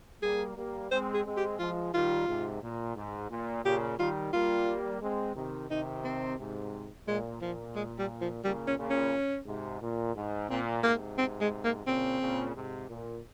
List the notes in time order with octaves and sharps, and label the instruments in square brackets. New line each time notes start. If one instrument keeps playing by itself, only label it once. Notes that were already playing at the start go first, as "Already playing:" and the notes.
[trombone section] G3 A#3 [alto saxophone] G#4
[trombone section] G3 A#3
[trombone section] G#3 C4 [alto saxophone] C5
[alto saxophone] G#4
[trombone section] G#3 C4
[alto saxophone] G4
[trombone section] F3 G#3 [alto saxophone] F4
[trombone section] D#3 G3 [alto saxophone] F4
[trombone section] G#2 C3
A#2
G#2
A#2
[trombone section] A#2 C#3 [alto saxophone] G4
[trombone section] D#3 G3 [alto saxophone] F4
[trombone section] G3 A#3 [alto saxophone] F4
[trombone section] G#3 C4
C3 D#3
[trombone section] C3 D#3 [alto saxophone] D#4
[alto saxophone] C4
[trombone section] G#2 C3
[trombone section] A#2 [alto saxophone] G#3
[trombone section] A#2 [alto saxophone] F3
[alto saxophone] G#3
G3
F3
[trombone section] A#2 C#3 [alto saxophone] G3
[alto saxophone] C#4
[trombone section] A#2 C#3
[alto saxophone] C#4
[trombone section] G#2 C3
A#2
G#2
[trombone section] A#2 [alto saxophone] C4
[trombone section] G#2 C3 [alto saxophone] A#3
[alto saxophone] C4
G#3
A#3
[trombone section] A#2 C#3 [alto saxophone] C4
[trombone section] A#2 C#3
G#2 C3
A#2